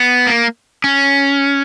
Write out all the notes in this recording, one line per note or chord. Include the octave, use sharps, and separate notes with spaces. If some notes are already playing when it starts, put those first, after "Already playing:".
Already playing: B3
A#3
C#4